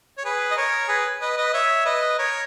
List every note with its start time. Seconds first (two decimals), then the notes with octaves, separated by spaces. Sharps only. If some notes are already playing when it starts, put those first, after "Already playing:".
0.18 C#5
0.25 G#4 B4
0.51 D#5
0.57 A#4 C#5
0.88 G#4 B4
1.21 B4 D#5
1.37 B4 D#5
1.54 C#5 E5
1.86 B4 D#5
2.18 A#4 C#5